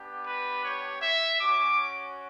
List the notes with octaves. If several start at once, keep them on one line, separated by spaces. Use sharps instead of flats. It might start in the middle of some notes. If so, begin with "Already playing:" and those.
Already playing: B3 D4 G4
B4
C#5
E5
C#4 F#4 D6